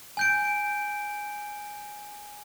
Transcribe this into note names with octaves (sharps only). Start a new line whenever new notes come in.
G#5 G6 D7